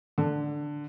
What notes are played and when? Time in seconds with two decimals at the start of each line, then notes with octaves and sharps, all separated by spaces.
0.18 D3